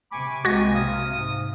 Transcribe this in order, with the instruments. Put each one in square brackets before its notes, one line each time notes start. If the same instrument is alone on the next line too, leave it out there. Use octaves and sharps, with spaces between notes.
[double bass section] C3 [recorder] G#5 [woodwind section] B5 C#6 D6
[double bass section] C2 C3 A#3 [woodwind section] G#3 [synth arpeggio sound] F#4 G#6 A#6 [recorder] G#5
[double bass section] C3 [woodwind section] F5 [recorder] D#6
[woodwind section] G#2